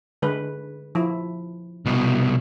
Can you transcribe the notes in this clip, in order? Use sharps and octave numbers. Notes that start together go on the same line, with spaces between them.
D3 G#3 B4
F3 E4
C2 B2